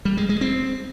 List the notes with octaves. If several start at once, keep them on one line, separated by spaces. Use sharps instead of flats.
G3
G#3
G#3
C4